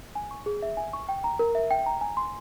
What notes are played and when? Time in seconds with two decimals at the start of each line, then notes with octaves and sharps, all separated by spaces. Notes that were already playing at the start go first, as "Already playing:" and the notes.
0.15 G#5
0.31 C#6
0.46 G#4
0.62 E5
0.77 G#5
0.93 C#6
1.09 G5
1.24 A#5
1.39 A#4
1.55 E5
1.71 G5
1.86 A#5
2.01 G#5
2.17 C6